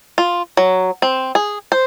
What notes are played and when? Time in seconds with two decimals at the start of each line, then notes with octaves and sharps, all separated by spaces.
0.18 F4
0.57 F#3
1.02 C4
1.35 G#4
1.72 C5